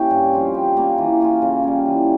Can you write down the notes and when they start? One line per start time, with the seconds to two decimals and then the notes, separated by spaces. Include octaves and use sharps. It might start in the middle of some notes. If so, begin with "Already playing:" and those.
Already playing: A#3 C#4 E4 G4 C#5
0.11 G2
0.33 F3 C4 F4
0.54 G3
0.77 A#3 C#4
0.98 E3
1.20 A#3 C#4 F4
1.42 C#3
1.64 G3 C#4
1.86 E3